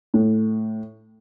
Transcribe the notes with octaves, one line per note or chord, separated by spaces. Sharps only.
A2